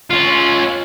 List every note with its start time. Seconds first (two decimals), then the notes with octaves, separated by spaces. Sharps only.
0.10 C#4 F4